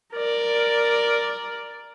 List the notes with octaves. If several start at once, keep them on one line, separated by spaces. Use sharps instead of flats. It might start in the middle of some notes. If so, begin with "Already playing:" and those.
A#4 D5